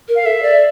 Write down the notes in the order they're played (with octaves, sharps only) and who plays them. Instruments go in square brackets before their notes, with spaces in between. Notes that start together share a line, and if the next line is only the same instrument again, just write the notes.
[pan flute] A#4
[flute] F5
[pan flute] A4 [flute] E5
[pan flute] D5